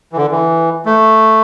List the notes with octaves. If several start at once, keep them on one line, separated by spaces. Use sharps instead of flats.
E3
D3
E3
A3